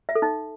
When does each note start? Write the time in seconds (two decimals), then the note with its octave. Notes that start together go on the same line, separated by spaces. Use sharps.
0.09 E5
0.15 A4
0.22 D#4